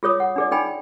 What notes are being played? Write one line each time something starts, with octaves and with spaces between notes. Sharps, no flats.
F4 G#4 C#5 D#6
F#5
D4 G#4 D5
D#4 G#4 G5 G#5 B5